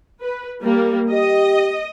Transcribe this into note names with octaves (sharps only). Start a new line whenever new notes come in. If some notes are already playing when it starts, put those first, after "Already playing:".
B4
G3 A#3
G4 D#5